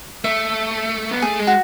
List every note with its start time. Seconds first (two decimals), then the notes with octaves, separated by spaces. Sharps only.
0.24 A3 E5
1.11 B3
1.22 A3 G#4
1.39 G#3
1.47 F#4